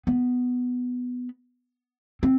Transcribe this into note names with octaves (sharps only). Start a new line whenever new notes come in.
B3
C4